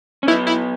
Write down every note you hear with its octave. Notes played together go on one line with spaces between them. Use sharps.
C#4
B3 D#4 E4
E4